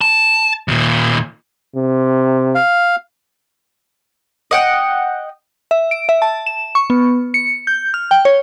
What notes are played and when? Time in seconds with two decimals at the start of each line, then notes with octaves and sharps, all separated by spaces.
0.01 A5
0.68 D#2 A#2
1.75 C3
2.55 F5
4.51 D#5 F#5 G5
5.71 E5
5.91 D7
6.09 E5
6.22 A5
6.46 E7
6.75 C#6
6.90 B3
7.34 C#7
7.67 G6
7.94 F6
8.11 G5
8.25 C#5